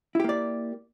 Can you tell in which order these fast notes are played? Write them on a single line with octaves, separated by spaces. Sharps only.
E4 G4 A#3 D5